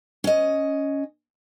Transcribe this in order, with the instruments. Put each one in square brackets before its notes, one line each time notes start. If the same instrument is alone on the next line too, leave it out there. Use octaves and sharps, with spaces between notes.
[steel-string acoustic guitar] C#4 D#5